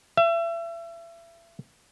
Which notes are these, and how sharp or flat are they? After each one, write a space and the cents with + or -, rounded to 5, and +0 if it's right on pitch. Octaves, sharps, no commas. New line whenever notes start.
E5 +35